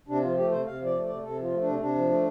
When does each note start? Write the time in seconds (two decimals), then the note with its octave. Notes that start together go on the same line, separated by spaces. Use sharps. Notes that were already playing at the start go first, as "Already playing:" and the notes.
0.08 C3 D4
0.23 F3 F4
0.37 A3 G4
0.51 C3 C5
0.66 C3 F5
0.80 F3
0.86 D5
0.94 A3
1.05 C3 D5
1.23 C3 A4
1.37 F3 F4
1.51 A3
1.61 C3 D4
1.80 C3 D4
1.95 F3
2.09 A3